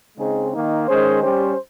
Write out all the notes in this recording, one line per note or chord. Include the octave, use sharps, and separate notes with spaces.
C#3 G#3 C4 D#4 G#4
D#3 A#3 D#4
D#3 G#3 C#4 G#4 C5
G3 C#4 G4 C5